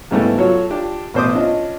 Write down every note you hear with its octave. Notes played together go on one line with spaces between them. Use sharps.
G#2 C#3 G3 A3 B3 E4
F#3 F4 F#4 A4 C#5
D4 F4 G4
A1 B2 C5 C6 D6 D#6
C#4 D4 F4 D#5